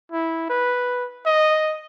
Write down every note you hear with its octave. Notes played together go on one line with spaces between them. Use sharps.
E4
B4
D#5